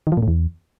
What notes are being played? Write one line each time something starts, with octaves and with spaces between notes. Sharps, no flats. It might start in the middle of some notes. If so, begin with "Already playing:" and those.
D#3
F3
A#2
A2
E2